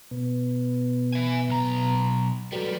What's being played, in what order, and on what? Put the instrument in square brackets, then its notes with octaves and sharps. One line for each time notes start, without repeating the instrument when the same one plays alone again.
[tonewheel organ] B2 B3
[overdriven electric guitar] E5 G#5
B1 A#5
[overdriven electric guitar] F#3 G3 [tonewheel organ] F#4 A4 B4